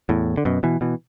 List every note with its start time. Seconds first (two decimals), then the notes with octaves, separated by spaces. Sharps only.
0.09 E2 A2
0.37 D3
0.45 F#2 B2
0.63 B2 E3
0.81 B2 E3